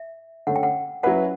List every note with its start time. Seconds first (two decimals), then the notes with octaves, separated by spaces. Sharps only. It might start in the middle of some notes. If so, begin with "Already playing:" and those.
Already playing: E5
0.47 D3 A3 C#4 F#5
0.56 G5
0.63 F#5
1.03 F#3 C#4 E4 B4 F#5